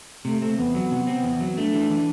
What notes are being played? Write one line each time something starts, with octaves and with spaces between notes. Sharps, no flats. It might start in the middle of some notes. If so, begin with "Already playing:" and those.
C3 A3
A3 C4
E2 B3
F#3
C3
C4
E2
F#3
A3 D4
E3
E3